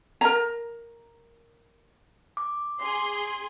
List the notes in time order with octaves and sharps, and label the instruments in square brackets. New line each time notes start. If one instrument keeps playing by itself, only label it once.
[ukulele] A#4 A#5
[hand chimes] D6
[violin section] G#4 C6